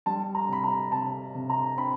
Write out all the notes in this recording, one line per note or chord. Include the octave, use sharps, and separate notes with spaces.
G3 A5
A#5
C3 B5
A#5
C3 A5
C3
A#5
C4 B5